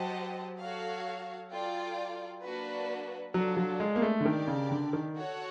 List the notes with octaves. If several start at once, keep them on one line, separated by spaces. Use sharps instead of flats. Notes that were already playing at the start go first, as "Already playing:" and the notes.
Already playing: F#3 G4 C5 D#5 F#5 A5
F#4 A4 C#5 F5
F4 A4 D5 G5
A#3 D4 F#4 B4
F#3 D4 F4 A4
F#3
G#3
A#3
A3
D3
D#3 D4 G4 A#4 D5
C#3
D3
D#3
F#4 A4 C#5 F#5